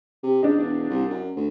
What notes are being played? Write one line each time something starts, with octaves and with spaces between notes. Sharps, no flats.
C3
G#2 D4 D#4
E1
C2
F#2
D2